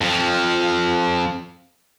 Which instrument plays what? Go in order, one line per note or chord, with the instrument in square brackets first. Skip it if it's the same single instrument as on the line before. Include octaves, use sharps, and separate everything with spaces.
[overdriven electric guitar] F2 F3